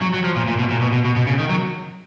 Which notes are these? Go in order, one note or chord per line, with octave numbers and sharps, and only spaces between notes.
F#3
F#3
F3
A#2
A#2
B2
A#2
B2
B2
B2
B2
C#3
D#3
F#3